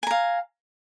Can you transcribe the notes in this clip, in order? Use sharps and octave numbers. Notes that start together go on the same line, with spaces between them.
F5 G#5 A#5